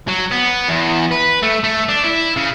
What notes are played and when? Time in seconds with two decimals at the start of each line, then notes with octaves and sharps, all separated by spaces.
0.08 F#3
0.31 B3
0.68 E2
1.11 B4
1.43 A3
1.64 A3
1.89 D4
2.04 E4
2.36 C#3